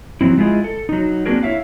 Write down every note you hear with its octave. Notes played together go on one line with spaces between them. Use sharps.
F3 F#3 C4 E4
G#3 E4 F4 G#4 D#5
A4
F#3 D#4
A#3 C4 D4 F#4 G#4 A#4
E4 C#5 E5 F5